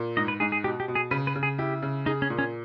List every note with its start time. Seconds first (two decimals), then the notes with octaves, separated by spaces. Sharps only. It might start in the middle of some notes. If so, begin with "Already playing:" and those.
Already playing: A#2
0.17 G#2 D#5
0.28 B4
0.40 G#2 G#4
0.52 G#4
0.64 B2 G4
0.80 G4
0.88 B2
0.95 G#4
1.11 C#3 B4
1.27 B4
1.35 C#3
1.43 G#4
1.58 E4 G4
1.82 C#3
2.06 D#4 G#4
2.22 C#4
2.30 A#2
2.39 C#4